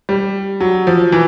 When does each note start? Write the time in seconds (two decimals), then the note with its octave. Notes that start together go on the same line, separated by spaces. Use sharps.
0.09 G3
0.60 F#3
0.87 F3
1.12 E3